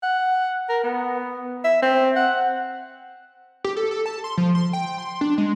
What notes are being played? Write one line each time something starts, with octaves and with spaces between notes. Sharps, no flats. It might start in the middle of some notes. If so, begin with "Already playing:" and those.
F#5
A#4
B3
E5
C4
F#5
G4
A4
A4
A5
C6
F3
C6
G5
C6
D4
G#3